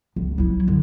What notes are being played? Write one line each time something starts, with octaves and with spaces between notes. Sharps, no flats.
C#2
F#3 E4
D3